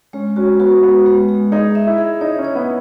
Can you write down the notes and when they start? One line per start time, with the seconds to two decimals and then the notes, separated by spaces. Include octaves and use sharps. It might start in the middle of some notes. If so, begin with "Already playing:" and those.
0.13 G#3 C#4
0.36 C#4 F#4
0.59 B3 F#4
0.83 G#3 B3
1.06 G#3
1.28 G#3
1.52 D#4 G#4
1.75 E5
1.87 E4
1.98 G#4
2.21 D#4 C#5
2.38 C#4
2.45 C#5
2.55 B3